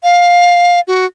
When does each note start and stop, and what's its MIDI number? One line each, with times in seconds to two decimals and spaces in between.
0.03 0.80 77
0.87 1.05 66